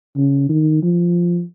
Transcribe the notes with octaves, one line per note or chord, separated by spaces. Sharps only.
C#3
D#3
F3